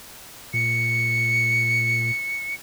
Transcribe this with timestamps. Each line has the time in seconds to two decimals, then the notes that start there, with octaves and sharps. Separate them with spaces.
0.54 A#2 C#7